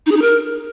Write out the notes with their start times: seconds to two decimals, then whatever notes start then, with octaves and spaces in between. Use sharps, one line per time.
0.06 D#4
0.11 G#4
0.16 D#4
0.22 A#4